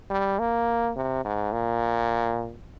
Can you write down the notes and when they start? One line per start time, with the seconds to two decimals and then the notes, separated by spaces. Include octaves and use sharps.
0.11 G3
0.39 A#3
0.96 C3
1.25 G#2
1.52 A#2